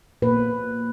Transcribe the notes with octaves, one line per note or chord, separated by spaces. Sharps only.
A#2 A#3 B4